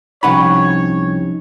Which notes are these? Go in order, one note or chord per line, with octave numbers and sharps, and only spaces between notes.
C2 F3 C#4 D#4 C#5 F#5 B5